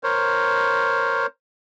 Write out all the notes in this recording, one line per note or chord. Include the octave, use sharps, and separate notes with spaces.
A#4 C5 C#5